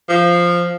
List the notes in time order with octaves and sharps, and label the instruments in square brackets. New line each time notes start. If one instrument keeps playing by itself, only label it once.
[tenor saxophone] F3